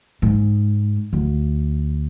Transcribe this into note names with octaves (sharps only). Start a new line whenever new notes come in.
G#2
D2